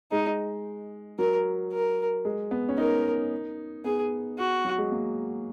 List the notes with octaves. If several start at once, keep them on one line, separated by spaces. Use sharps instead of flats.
G#3 D#4
F#3 A#4
A#4
G#3
B3
C#4
D#4 A#4
B3 G#4
F#4
F#3
G#3
A#3